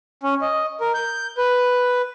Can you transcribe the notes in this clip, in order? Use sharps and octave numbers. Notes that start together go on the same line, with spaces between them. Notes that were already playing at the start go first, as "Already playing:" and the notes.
C#4
D#5
A#4
G6
B4